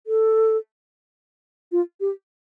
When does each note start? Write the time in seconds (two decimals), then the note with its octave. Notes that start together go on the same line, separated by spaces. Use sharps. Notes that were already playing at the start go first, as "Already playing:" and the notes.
0.07 A4
1.72 F4
2.00 G4